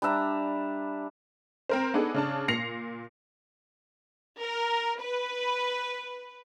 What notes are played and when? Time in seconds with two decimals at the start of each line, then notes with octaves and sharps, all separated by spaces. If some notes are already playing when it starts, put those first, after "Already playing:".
0.02 G3 D4 E5 A#5
1.69 C4 A#4 C5
1.94 B3 D4 D#4 G#4 A4
2.14 C#3 D4 A5
2.48 A#2 A#6 C7 C#7 F7
4.40 A#4
5.01 B4